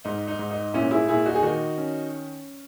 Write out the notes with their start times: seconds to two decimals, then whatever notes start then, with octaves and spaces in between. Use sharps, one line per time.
0.05 G#2 D#4
0.27 D#4
0.39 G#2
0.51 D#4
0.73 A#2 C#4 E4
0.91 E4 G#4
1.08 A#2 E4 G#4
1.26 D#4 F#4
1.35 G#4
1.43 D#3 D#4 F#4
1.78 C#4